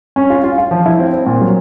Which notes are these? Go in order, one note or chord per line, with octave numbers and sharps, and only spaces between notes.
C#4
F4
F4
F4
F3
E4
C4
C4
A#2
F#3